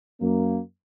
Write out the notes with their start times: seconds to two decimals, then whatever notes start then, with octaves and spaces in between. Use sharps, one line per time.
0.21 F#2 A#3